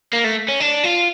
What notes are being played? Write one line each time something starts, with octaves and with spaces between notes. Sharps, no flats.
A#3
A3
C#4
D4
F4